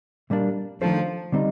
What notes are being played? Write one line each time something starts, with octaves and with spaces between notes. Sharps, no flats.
A#2 G3 A#3 D4
D#3 F3 A3 D4 A4 C5
D3 G3 C4 D#4